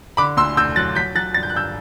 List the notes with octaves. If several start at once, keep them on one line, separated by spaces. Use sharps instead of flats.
D3 B5 D6
D2 C6 E6
D2 E6 G6
F#3 F#6 A6
F#3 G6 B6
F#3 F#6 A6
G2 A6
G6
F#6
G2 E6 G6